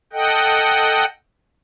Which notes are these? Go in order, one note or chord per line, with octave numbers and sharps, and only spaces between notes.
A4 D#5 F#5 G5